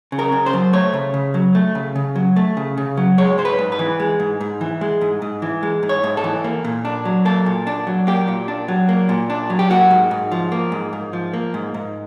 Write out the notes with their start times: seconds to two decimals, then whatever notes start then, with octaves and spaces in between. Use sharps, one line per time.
0.12 C#3
0.19 A#4
0.32 C#3
0.46 C5
0.53 F#3
0.73 A3 C#5
0.93 C#3
1.14 C#3
1.34 F#3
1.55 A3
1.75 C#3
1.96 C#3
2.16 F#3
2.36 A3
2.57 C#3
2.78 C#3
2.97 F#3
3.18 G#3 C#5
3.38 G#2 C5
3.45 B4
3.59 G#2
3.72 B4
3.79 E3
4.00 G#3
4.20 G#2
4.41 G#2
4.61 E3
4.81 G#3
5.01 G#2
5.22 G#2
5.42 E3
5.63 G#3
5.83 G#2
5.89 C#5
6.04 G#2
6.17 A4
6.24 E3
6.44 A#3
6.65 A#2
6.85 D4
7.05 F#3
7.25 A#3 A4
7.46 A#2
7.67 D4
7.87 F#3
8.07 A#3 G4
8.28 A#2
8.48 D4
8.68 F#3
8.89 A#3
9.09 A#2
9.30 D4
9.50 F#3
9.59 G4
9.70 A#3 F#4
9.91 G#2
10.11 G#2
10.32 F3
10.52 A#3
10.72 G#2
10.93 G#2
11.13 F3
11.33 A#3
11.54 G#2
11.74 G#2